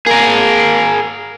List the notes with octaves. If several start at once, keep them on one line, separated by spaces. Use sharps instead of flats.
A#3 G#4 A#4